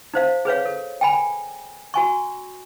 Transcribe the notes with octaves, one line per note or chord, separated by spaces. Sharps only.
D#4 C5 F5
G#4 B4 C#5 F5
A4
G5 G#5 B5
F#4 G#5 C#6